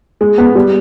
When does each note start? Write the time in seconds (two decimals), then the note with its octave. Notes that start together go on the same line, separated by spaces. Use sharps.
0.21 G#3
0.38 B3
0.55 G3